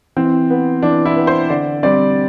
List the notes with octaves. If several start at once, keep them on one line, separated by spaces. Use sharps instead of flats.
E3 C4
B3
E3 D4
E4
B3
C5
D3 D5
G3 C4 D5